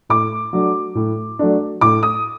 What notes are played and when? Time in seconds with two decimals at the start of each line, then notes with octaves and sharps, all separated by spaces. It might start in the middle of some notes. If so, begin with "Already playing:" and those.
0.09 A2 D6
0.53 F#3 A3 D4
0.95 A2
1.39 F#3 A3 D4
1.81 A2 D6
2.03 D#6